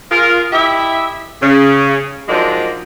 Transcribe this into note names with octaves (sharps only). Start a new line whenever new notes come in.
F4 G#4 A#4
E4 G4 D#5 E5
C#3
F3 F#3 G#3 A#3 D4 D#4